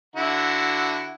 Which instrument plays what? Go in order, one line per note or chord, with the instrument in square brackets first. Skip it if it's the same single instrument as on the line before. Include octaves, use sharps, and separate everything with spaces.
[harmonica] D3 E4 F#4